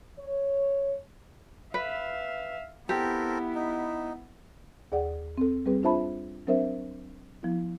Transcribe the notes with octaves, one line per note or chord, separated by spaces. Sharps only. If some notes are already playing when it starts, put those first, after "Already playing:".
C#5
B4 E5 F5
B3 C4 E4 G4 A4 A#4
D#4
D#2 G#4 D5 F#5
C4 A4
G3 C4 G#4 B4
D4 F4 C5 E5 A5 B5
F#3 C4 D4 A#4 C5 E5
F3 B3 E4